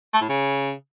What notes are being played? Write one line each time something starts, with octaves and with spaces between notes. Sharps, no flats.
A3
A2
C#3